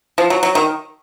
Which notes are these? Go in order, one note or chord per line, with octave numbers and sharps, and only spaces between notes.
F3
F#3
F#3
D#3